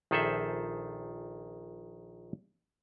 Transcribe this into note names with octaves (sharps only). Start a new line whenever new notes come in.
A#1 D#3 G#4 A4 C5 E5